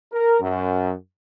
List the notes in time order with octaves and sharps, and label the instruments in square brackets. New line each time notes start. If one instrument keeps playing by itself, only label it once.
[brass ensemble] A#4
F#2